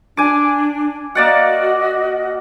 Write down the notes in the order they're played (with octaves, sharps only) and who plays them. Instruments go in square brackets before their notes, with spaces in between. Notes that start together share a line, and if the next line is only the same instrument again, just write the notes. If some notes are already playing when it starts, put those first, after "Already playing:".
[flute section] D4 [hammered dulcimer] G#5 D6
[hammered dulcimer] A#3 D5 F#5 [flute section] F#4 D#5